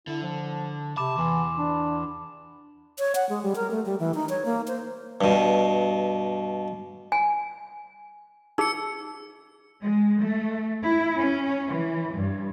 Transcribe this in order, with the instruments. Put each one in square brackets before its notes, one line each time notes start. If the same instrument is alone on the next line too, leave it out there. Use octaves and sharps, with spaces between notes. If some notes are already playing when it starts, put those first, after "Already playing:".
[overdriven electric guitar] D3 [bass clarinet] E4
[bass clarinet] F3
[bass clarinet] C3 [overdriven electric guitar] A5 [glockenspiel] B5 D6 E7
[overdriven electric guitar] E2 [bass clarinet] E3 [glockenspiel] C6
[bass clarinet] D4
[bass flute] C#5
F#5
G#3
G3
A#4
A3
G3
E3
D#4
C#5
A#3
C5
[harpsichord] G2 B2
[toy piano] G#5
[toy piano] D#4 G#4 [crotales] E6 C#7
[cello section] G#3
A3
E4
C#4
E3
G2